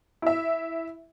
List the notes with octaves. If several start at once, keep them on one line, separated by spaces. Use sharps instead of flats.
E4 E5